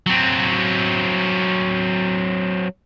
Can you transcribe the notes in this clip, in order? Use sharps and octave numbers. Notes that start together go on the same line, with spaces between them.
F#3 C4